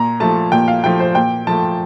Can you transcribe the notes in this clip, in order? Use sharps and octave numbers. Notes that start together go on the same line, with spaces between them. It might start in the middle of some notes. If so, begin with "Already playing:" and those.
Already playing: A#2 A#5
F3 A3 A5
A#2 G5
F5
F3 A3 G5
C5
A#2 G5
F3 A3 A5